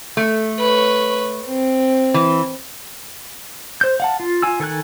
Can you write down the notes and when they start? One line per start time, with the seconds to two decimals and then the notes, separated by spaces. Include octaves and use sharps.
0.17 A3
0.60 B4 C#5
1.46 C4
2.14 E3
3.81 C5 G6
4.00 F5 F#5 A5
4.20 F4
4.42 F4 G#5 E6
4.60 D#3 A4 G#5 F#6